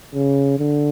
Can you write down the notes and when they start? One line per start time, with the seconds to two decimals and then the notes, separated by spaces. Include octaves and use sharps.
0.14 C#3
0.59 D3